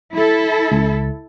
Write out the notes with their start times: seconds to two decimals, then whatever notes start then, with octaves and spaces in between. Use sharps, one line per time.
0.13 E4 A4
0.72 C#2